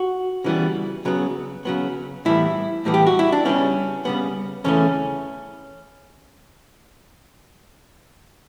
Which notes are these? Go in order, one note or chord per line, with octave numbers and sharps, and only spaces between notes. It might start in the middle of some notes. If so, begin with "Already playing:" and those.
Already playing: F#4
C#3 E3 G3 B3
C#3 F#3 B3
C#3 F#3 B3
A2 E3 G3 B3 E4
A2 E3 G3 B3
G4
F#4
E4
D4
C#3 G3 B3 C#4
C#3 G3 B3
E2 C#3 E3 A3 C#4